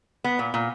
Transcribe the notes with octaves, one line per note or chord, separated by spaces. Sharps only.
B3
A#2
A#2